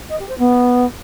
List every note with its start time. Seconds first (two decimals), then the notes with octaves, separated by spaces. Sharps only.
0.09 D#5
0.19 G4
0.28 C5
0.38 B3